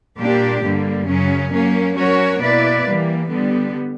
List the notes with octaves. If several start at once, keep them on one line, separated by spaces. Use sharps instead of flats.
A#2 G3 A#3 D4 G4
G2 D3 G3 A#3
F#2 C#3 F#3 C#4
F#3 A#3 C#4
F#3 C#4 F#4 A#4 C#5
B2 A#3 E4 B4 D5
E3 G3 A#3
D3 G3 B3